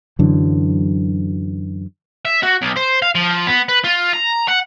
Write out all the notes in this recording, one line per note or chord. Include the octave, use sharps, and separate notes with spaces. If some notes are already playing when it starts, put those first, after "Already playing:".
F#2 D3 E3 F#3
E5
F#4
B1
C5
F5
F3
B3
B4
F4
A#5
F#5